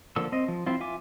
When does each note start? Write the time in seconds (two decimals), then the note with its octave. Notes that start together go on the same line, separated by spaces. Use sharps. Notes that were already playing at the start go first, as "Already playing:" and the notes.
0.16 D3 F3 A#3 A4 E6
0.32 C4 D#5
0.48 F3
0.66 F3 C4 E4 F4
0.80 F4 E5 G#5 D6